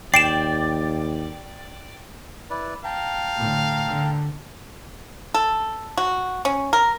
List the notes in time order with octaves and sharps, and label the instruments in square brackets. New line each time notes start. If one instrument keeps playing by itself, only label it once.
[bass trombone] D#2 [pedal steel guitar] D5 [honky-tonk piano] G5 [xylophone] C7 D7 E7
[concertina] E4 B4 D5
[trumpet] F5 [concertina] G5 A5 A#5
[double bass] A2 D3
D3
[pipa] A4
F#4
C#4
A#4